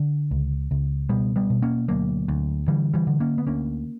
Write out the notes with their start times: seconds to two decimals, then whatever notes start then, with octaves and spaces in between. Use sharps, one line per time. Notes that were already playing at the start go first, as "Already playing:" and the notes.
Already playing: D3
0.31 C#2
0.71 C#2
1.09 B2 G3 B3
1.36 G3 B3
1.50 B2
1.62 A#3 C#4
1.88 D2 F#3 A#3
2.28 D2
2.68 D3 E3 G3
2.94 E3 G3
3.07 D3
3.20 A#3 C#4
3.38 B3
3.47 D2 A#3 C#4